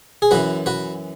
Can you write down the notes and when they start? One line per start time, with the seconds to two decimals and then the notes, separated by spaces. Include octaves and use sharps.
0.22 G#4
0.31 F#2 E3 F#4 B4
0.66 F#4 B4